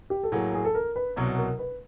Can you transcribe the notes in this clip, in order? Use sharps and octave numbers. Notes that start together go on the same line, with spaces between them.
G4
A4
A2 F#3 A#3 G#4
G#4
A4
A#4
B4
C2 B2 F#3
A#4
B4